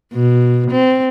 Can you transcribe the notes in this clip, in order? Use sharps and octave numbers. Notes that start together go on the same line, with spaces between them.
B2
C4